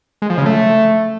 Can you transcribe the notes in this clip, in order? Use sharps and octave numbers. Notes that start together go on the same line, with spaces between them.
G#3
F3
C#3
A3